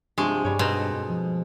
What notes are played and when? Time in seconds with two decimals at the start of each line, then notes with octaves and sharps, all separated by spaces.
0.18 G2 C3 F3 G#3
0.45 G2 G3 C#5
0.59 B2 C4 D#4
0.80 A4
1.09 F3